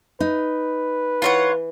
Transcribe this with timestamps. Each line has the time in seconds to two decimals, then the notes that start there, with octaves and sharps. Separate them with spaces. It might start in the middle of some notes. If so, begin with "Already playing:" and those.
0.20 D#4 B4
1.22 E3 F4 C#5 F#5